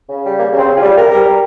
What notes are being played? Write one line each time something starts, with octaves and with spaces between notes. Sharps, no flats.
C#3
G3
C#3 A#3
C#3 C4
C#3
F4 G#4
G3
C3 G4 A#4
G3
G3